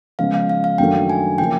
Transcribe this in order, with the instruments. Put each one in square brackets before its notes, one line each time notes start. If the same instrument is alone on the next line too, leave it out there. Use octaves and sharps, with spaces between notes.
[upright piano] C#3 F3 G#3 B3 [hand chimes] F5
[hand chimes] F5
F5
F5
[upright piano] F#2 D#3 F#3 A3 D4 [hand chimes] G5
[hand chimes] G#5
[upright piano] C#3 F3 A#3 C#4 E4 [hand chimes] G5